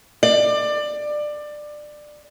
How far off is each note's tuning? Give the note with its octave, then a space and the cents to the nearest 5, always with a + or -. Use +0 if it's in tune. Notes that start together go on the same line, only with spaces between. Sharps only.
D5 +20